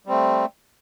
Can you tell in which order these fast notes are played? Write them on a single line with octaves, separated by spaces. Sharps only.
G3 C4 A3